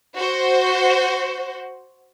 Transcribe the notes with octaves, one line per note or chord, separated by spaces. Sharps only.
F#4 C5